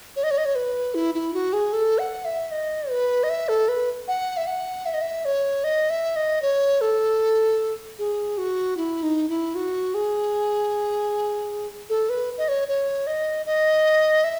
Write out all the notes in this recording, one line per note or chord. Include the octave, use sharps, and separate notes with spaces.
C#5
D#5
C#5
D#5
C#5
B4
E4
E4
F#4
G#4
A4
F#5
E5
D#5
B4
D#5
E5
A4
B4
F#5
E5
F#5
E5
D#5
E5
C#5
D#5
E5
D#5
C#5
A4
G#4
F#4
E4
D#4
E4
F#4
G#4
A4
B4
D#5
C#5
C#5
D#5
D#5
E5